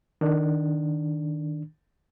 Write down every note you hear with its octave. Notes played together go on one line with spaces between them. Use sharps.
D#3 D4